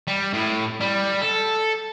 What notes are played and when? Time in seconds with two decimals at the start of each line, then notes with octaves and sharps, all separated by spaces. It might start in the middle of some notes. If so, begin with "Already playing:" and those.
0.08 G3
0.33 A2
0.80 G3
1.22 A4